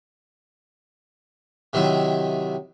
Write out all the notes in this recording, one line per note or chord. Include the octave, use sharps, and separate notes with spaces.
C3 D#3 F#3 E4